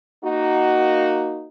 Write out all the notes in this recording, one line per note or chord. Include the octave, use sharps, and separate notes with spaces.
A#3 D#4 F#4